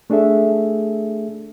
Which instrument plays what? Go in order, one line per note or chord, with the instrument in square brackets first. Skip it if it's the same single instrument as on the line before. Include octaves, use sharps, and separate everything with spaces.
[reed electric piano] A3 D4 G#4 A4 E5